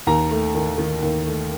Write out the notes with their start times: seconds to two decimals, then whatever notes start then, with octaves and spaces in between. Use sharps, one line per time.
0.07 D#2 A#5
0.31 A3
0.55 D#3
0.78 D#3
1.02 D#2
1.26 A3